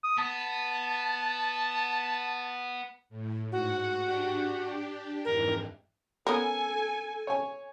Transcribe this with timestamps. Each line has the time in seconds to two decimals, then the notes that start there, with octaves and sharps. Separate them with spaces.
0.03 D#6
0.18 B3 A5
3.09 A2
3.52 G#2 F#4 F#5
4.01 D4 G4
5.25 F2 G#2 E3 A#4
6.27 B3 C#4 A4 A#4 G#5
7.27 C#5 G#5